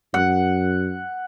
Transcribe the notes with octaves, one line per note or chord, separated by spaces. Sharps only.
F#2 F#5